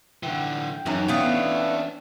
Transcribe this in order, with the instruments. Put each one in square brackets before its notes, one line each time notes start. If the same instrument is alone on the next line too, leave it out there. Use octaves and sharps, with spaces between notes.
[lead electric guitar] D3 E3 [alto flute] G5
[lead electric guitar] F#2 [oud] E3 C#4 D#4
[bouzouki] A3 B3 F5 [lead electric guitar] D4 C#5